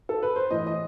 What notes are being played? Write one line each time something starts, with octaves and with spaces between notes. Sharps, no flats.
A4
B4
C5
A2 E3 D#5
D#5